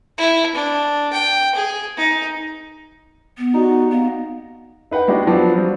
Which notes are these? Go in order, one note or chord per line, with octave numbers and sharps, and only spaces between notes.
E4
D4
G5
G#4
D#4
B3
D#4 F#4 G4 D5
B3 D#5 F5
D#4 B4 F#5 G5
G#3 D4 D#4 F#4 G4
F3 F#3 B3 D4
F#3 G3 C4